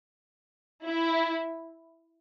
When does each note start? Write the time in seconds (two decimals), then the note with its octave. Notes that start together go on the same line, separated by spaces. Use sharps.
0.85 E4